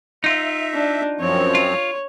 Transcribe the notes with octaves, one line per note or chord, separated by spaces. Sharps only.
D#4 F4 E5
D4
F#2 F3 C4 C#5
F4